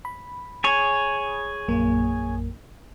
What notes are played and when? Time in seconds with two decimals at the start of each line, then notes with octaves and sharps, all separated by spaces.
0.05 B5
0.64 G#4 C#5
1.68 A#1 F#2 A#3